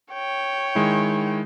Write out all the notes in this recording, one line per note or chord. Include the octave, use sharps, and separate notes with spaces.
C#5 G5
D#3 G#3 E4